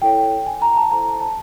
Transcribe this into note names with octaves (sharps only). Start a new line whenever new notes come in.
E4 A4 C#5 G5
G#5
A#5
A5
E4 A4 C5 A#5
A5